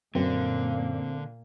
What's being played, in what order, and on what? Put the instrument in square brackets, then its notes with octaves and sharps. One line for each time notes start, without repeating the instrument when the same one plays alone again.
[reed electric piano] F#2 [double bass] A#2 A#3 [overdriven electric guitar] D3 [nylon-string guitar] C4